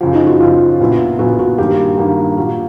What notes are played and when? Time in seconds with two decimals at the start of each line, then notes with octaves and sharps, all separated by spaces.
0.01 F#2 C#3 F3
0.14 D#4
0.27 F#4
0.40 F#2 C#3 F3 F4
0.80 A#1 A#2 F#3 B3 E4
1.19 A#1 A#2 F#3 B3 E4 F#4
1.39 F#4
1.58 G2 D#3 F#3 A#3 G4
1.98 G2 D#3 F#3 A#3
2.37 A#2 F#3 A#3